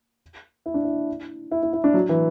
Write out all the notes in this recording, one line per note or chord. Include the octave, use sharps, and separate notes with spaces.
E4
D4
E4
E4
E4
E4
D4
F#3
E3